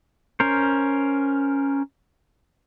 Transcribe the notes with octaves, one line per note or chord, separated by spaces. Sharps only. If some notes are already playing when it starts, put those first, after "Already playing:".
C#4 A#4 C5